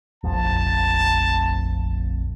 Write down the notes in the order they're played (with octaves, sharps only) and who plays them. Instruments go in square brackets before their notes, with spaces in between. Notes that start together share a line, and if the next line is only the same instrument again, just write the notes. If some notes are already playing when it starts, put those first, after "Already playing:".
[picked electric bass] F1 A#1 F2 [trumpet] A5